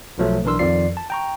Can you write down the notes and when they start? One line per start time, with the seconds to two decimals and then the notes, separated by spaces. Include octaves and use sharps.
0.18 B1 B2 F3 F#3 A3 A4
0.44 B1 E3 D4 A#4 C6 E6
0.59 F2 D#3 F3 F4 D5 C7
0.97 A5
1.10 G5 A#5 C#6